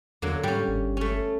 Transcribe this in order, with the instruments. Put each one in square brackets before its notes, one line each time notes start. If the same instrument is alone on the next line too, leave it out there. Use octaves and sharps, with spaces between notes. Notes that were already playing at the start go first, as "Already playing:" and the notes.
[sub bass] E2 [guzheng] D3 F#3 A#3
[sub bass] G#2 [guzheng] G3 C#4
[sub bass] G1
[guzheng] A3 C#4